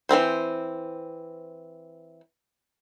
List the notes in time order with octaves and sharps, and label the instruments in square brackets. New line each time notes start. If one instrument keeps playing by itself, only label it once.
[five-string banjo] E3 A3 C4 C5